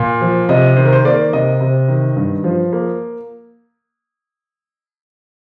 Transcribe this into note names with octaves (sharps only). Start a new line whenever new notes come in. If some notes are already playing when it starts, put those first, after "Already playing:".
Already playing: A#2
F3
C3 D#5
D#3 C5
A#4
C5
A#3 D5
C3 D#5
C3
D#3
G2
F3
A#3